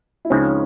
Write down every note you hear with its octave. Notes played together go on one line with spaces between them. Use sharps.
E4
C#2 C#3 F3 G#3 C4 C#4 D#4